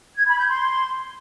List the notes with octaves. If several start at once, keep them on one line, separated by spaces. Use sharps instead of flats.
G#6
B5
G6
C6